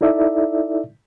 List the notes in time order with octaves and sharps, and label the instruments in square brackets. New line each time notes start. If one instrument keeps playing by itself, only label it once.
[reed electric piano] D#4 E4 A4 D5 E5